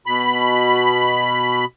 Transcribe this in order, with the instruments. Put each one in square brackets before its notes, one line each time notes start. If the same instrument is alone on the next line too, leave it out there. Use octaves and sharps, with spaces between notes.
[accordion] B2 B5